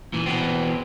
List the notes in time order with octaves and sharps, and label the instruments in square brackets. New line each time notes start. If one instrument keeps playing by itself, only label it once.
[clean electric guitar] A#2 E3
B2 E3 B3 C4